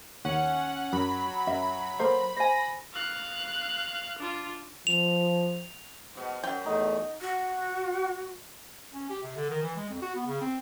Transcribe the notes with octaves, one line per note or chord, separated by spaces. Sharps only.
D#2 C#4 F#5
F#2 F#3 B5
F#2 E5
A#3 A4 A#4 C5
C5 G#5 A#6
F5 F#6
D4 F4
F3 F7
G#2 B2
F#2 G5
E2 A3 D#4
F#4
C#4
G4
C3
D3
D#3
E3
G#3
F2
F#4
B3
C#3
C4